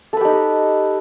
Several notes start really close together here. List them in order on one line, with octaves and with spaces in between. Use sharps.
A4 B4 G4 D#4